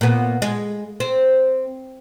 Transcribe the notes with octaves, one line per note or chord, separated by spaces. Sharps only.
A#2 B3
G#3
C4